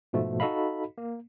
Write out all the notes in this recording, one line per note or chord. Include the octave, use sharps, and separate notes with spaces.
G#2 B2 F3 A3
D#4 F#4 A4 D#5 F5 B5
A#3